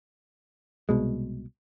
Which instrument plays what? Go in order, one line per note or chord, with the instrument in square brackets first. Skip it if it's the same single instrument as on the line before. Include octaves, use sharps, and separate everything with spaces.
[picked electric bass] C2 B2 G#3